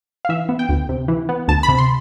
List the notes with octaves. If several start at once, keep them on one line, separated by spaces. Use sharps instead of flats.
F5
E3 E5
B3
G5
D2
C3
E3
B3
D2 A5
B5
C3
C6